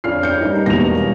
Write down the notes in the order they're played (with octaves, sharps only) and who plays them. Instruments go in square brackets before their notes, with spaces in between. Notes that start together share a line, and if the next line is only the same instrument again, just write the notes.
[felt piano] F2 [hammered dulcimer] C#3 [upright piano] D4 F6 C7
[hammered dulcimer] G2 [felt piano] G6 C#7
[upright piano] G3 D#4 [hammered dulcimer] A#4
[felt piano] E1 A#3 A#6 [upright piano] B2 E4 F7 [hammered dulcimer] C#5 F5